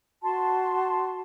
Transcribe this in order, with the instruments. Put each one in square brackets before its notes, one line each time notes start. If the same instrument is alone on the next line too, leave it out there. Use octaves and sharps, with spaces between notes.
[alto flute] F#4 [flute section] A5 C6